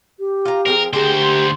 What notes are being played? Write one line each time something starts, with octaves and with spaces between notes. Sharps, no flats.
G4
F4 A#5
F3 C4 G#4 A#4
D2 G4 G#4 A#4 C5 G#5
C6